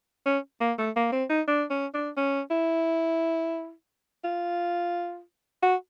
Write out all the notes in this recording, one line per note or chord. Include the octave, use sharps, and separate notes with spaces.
C#4
A#3
A3
A#3
C4
D#4
D4
C#4
D4
C#4
E4
F4
F#4